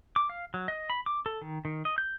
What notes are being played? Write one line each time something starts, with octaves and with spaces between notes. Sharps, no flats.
D6
F5
F#3
D#5
B5
D6
A4
D#3
D#3
D#5
G6